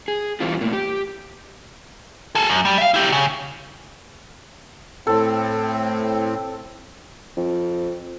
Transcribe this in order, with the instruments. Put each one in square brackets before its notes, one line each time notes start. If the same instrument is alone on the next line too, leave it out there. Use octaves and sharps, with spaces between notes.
[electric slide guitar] G#4
E3 G3 C4 F4
A2 A#3
G4
[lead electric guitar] G#4 A4
F#2
G3
E5 F5
E4 G4
C#3
[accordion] A2 C4 [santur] A4
[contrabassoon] F2